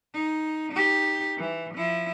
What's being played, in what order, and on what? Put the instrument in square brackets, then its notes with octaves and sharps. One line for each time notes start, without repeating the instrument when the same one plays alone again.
[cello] D#4
D#4 G4
E3
F3 E4